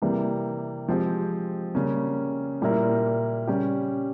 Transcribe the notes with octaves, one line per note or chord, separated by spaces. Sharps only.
C3 E3 G3 A#3
F3 G#3 C4 G4
C#3 G3 A#3 C#4
A#2 G3 A#3 E4 A#4
C#3 G3 C#4 G4